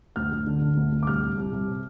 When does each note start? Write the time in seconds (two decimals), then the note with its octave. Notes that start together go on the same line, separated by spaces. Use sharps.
0.16 D2 F6
0.32 D2
0.47 D3
0.62 D3
0.77 D2
0.92 D2
1.03 D6
1.07 C2 F6
1.23 C2
1.37 C2
1.52 C2
1.68 C3